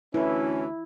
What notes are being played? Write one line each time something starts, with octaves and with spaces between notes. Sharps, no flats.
D2 E3 C#4 E4